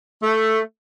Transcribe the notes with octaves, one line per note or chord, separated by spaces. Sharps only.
A3